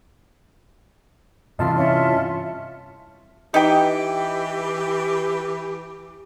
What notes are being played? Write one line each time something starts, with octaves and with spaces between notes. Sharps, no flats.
G2 C3 E3 F4 D#5 A5 C6 F6
C#4 F4 E5
E3 D#4 G4 B4 G5